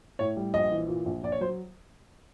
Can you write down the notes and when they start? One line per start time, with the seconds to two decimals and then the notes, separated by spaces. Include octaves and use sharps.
0.19 A2 C#5
0.37 G3
0.54 A#1 D#5
0.71 E3
0.88 A#2
1.06 A#1
1.23 A#1 D5
1.32 C#5
1.41 F#3 C5